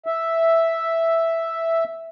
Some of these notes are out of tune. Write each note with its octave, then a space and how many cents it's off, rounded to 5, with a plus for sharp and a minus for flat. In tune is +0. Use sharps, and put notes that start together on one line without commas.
E5 +0